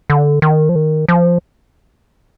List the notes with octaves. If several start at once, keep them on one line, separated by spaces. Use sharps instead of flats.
D3
D#3
F3
D#3
F3